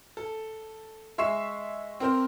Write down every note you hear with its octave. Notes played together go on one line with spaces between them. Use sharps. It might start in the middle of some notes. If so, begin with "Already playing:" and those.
A4
G#3 E5 C#6 B6 C7 E7
C4 A#4 C5